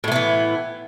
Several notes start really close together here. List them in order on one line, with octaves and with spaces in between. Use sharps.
A2 A3 B3 E3